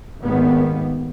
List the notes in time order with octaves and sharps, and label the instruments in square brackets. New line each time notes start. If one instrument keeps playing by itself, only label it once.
[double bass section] G#1 D#2 D#3 A#3 B3